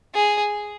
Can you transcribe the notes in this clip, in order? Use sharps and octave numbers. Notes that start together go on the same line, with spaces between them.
G#4